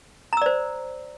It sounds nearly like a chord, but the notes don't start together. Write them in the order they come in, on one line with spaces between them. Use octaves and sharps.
A#5 E6 D5 C5